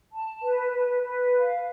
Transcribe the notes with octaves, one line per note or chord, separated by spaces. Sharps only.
A5
B4
B4
B4
F5